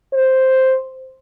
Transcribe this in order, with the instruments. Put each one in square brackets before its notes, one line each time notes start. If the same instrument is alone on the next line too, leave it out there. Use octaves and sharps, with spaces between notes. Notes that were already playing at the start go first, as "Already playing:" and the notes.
[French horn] C5